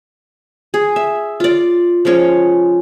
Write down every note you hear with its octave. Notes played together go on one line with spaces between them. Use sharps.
G#4
E5
F4 D5
F3 G#3 C#4 C#5